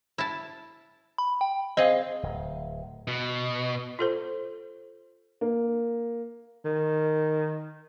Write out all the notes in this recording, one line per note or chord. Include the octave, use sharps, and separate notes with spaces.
E4 A5
B5
G5
C4 G#4 D#5 F5
D1
B2
F4 A4 C5
A#3
D#3